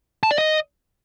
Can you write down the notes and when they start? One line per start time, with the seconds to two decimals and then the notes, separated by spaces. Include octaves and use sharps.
0.23 A5
0.31 D5
0.38 D#5